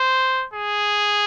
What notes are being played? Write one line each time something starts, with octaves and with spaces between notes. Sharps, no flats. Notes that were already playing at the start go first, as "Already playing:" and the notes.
Already playing: C5
G#4